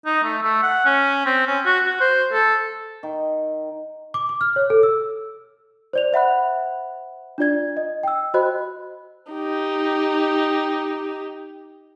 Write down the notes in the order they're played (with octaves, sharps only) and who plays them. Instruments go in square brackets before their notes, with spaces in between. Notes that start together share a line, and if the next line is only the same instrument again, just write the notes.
[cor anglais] D#4
A3
A3
F#5
C#4
C4
C#4
F#4
F#4
C5
A4
[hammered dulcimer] D#3
[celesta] D6
D6
F6
C#5
A4
E6
C5 D5 F7
C5 E5 F#5 B5 F#6
D4 F4 D5 G#6
D#5
G5 E6
F#4 C5 D#5 B5 F#6
[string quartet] D#4 G4